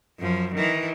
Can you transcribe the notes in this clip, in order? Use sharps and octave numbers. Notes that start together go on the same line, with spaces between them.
F#2 F3
D#3 E3